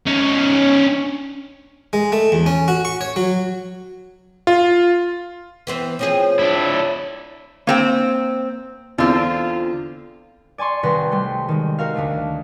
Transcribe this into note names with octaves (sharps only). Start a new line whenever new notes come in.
C#4 D#4
G#3
A3
E2
C#4
F#4
C#6
C#5
F#3
F4
E3 B3 C4
F3 C4 G#4 C#5
D4 E4
A#3 C4 G5
E2 D3 C4 F4
D5 G#5 A5 C6 C#6
C2 C3 D#3 B4 C6 A#6
G3 A3 F#4 C6
D#3 G#3
F#4 A#4 F5
D2 D3 A3